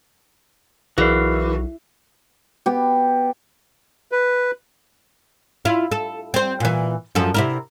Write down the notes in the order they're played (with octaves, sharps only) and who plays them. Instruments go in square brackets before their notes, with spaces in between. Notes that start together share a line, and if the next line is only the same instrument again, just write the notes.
[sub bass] B1 [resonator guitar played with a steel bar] E3 [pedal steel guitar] F#4 F5 [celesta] G#4 A#4 D5
[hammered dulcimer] B3 G4
[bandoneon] B4
[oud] E4 F4
A4
C4 C5
A#2 E3
F#2 F3 A4
C3 E4 A#4